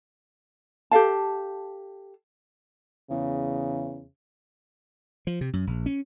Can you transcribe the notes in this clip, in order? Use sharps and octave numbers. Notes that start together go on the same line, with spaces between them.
G4 A4 F5 A5
E2 C#3
F3
C3
F#2
A#1
C#4